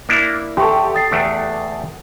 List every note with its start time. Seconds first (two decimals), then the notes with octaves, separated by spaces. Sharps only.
0.09 A#3 D4 E4
0.57 E2 G4 A4 C6 C#6
0.95 D#6 A6 C7
1.11 E2 A3 D4